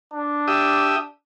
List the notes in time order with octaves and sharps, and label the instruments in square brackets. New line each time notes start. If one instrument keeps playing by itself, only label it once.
[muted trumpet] D4
[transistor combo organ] G4 E5 D#6